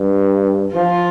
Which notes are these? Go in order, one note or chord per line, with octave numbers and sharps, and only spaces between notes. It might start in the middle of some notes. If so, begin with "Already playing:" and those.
Already playing: G2
F3 F4